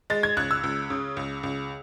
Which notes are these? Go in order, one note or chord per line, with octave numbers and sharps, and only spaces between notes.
G#3 A6
G#6
C#2 F#6
E6
C#2
C#3
C#2
C#2